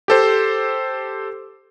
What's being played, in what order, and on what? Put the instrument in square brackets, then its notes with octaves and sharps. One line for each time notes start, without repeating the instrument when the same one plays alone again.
[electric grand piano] G4 A4 C5